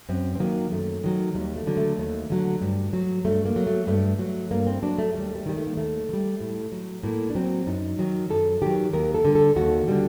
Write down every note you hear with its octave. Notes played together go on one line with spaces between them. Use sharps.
F#2 C4
C4
D#3 F#3 A#3
F#2 A3
D#3 F#3
D#2 G3
A3
D3 F#3
A3
D#2
D3 F#3
G2
F#3
G2 A3
A#3
F#3
A3
G2 A3
F#3
G2 A#3
C4
F#3 D4
A3
D#2 G3
G3
D#3 G3
A3
A#3
D#2 A3
D#3
G3
A2
F#3
A2 A#3
D4
F#3 C4
F#2 D#4
D#3 F#3
F#2 A4
D#3 F#3 G4
D#2 A#4
A4
D3 G3
A4
D#2 F#4
D3 G3